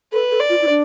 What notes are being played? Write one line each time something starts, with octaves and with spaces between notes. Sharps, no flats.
A4 B4
A4
D5
F4
E4
D4